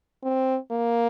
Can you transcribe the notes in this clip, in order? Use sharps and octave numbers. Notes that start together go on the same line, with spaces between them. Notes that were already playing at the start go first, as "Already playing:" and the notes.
C4
A#3